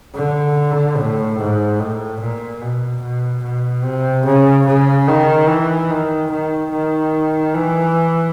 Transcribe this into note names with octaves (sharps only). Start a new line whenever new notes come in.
D3
A2
G#2
A2
A#2
B2
B2
B2
C3
C#3
C#3
D#3
E3
D#3
D#3
D#3
E3